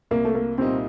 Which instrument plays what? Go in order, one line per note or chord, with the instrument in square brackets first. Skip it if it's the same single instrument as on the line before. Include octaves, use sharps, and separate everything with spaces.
[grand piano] C2 [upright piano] A#3
[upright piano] A3
A#3
[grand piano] A#2 G3 A#3 D#4 [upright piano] C4